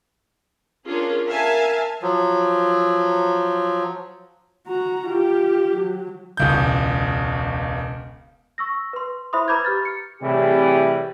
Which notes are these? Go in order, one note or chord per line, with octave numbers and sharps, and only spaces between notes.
C#4 D4 F4 G#4 A#4
A#4 E5 F5 G#5 A5
F3 F#3
F#4 A#5
F4 G4
F#3
E1 C#2 G6
C#6 E6 A#6
B4 C6
E4 C5 E5 B5 C6 D#6
B4 A#5 B5 D6 G6 G#6
G4 F6 A6
C#7
A2 C3 E3 G3 G4 G#4